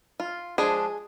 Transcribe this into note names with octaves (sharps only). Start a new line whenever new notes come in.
F4
F3 G#3 D4 G#4